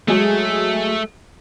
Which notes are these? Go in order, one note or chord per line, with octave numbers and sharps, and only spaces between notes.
F#3 G#3 A3 G#4